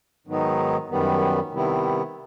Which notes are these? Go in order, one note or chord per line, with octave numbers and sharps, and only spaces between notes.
G#2 D#3 F#3 B3 D#4
F#2 D#3 G3 B3
C3 D#3 G3 B3 E4